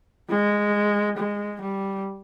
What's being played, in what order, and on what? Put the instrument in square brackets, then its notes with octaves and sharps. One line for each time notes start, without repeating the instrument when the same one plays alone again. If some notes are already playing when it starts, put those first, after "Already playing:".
[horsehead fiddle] G#3
G#3
G3